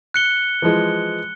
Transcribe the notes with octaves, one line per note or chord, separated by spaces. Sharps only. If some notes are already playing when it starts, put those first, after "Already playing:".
F#6 C#7 G7
E3 F3 G#3